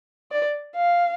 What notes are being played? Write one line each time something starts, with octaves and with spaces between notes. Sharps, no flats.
D5
F5